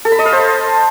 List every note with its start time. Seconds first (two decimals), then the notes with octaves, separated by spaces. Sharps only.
0.05 A4
0.12 B5
0.19 D#5
0.25 F5
0.32 C5